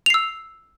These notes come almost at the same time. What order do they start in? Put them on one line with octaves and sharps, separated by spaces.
F7 C7 E6